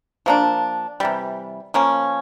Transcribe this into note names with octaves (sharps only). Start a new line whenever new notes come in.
F3 A#3 D4
C3 E3 G3
F3 A#3 C#4